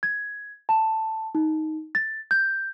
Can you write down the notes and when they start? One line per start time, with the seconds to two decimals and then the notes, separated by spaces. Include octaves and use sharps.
0.03 G#6
0.69 A5
1.35 D#4
1.95 A6
2.31 G6